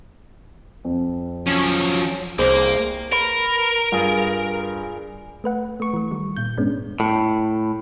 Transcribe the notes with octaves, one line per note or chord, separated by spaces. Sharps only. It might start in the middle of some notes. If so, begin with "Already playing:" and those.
F2
F3 F#3 C#4
C2 A#3 G#4 C5
A#4 B4
G2 F4 G#4
A3 B4 F#5
A3 C#6
E3 A3
D#3 G3
A#2 G6
G2 G#3 B3 C#4 D4
A2